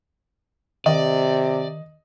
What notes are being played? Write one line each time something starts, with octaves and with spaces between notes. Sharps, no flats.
C3 D#3 D5 D#5